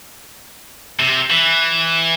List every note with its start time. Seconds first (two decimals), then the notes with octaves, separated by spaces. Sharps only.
0.99 C3
1.30 E3